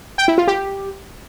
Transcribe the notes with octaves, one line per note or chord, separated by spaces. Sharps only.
G5
E4
F4
G4